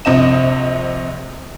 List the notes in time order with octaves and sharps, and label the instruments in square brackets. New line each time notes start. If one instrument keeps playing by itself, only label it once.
[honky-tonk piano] A#1 C3 D#5 E7